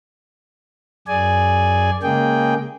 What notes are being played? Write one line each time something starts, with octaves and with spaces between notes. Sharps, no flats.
F#2 G#4 D5 G#5
C#3 G#3 A#3 G#4 G5